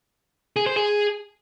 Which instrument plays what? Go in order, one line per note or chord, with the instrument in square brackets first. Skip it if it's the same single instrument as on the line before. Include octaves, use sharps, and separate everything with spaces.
[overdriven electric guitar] G#4
C5
G#4